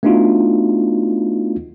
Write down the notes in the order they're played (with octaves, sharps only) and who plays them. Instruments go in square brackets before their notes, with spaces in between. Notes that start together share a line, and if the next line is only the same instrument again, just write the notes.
[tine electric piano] A3 B3 D4 D#4 F4 F#4